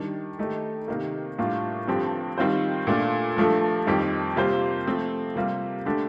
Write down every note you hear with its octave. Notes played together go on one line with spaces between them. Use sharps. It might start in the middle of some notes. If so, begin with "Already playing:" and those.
Already playing: D#3 G3 D4
D#3 A3 D#4 G4
C3 D#3 A#3
A2 G3 A#3 D4 F4
G2 D3 F3 C4 G4
D#3 G3 C4 F4 C5
A#2 A3 D4 F4
G2 F3 A3 D4 A4
F2 D#3 G3 C4 G4
C3 G3 A#3 F4 C5
F3 A3 C4
C3 G3 A#3 F4
D3 A3 D4 G4